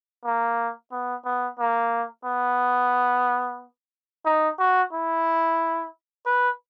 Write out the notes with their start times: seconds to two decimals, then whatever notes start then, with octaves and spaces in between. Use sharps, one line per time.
0.25 A#3
0.92 B3
1.25 B3
1.59 A#3
2.25 B3
4.26 D#4
4.59 F#4
4.93 E4
6.26 B4